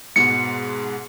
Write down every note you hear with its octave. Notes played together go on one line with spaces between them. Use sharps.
G#2 B2 G#3 C#7